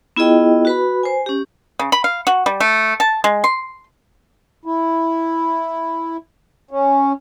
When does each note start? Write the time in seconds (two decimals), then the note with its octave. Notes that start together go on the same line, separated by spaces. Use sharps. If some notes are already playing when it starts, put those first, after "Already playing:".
0.17 B3 E4 F4 G#4 D#5 G5
0.65 F#4 B4 B5
1.03 C5 G#5
1.26 C#4 G4
1.79 C#3
1.92 B5
2.04 F5
2.27 F#4
2.46 G3
2.60 A3
3.00 A5
3.24 G#3
3.44 C6
4.66 E4
6.71 C#4